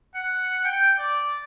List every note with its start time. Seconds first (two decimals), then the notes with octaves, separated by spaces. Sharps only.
0.15 F#5
0.65 G5
0.99 D5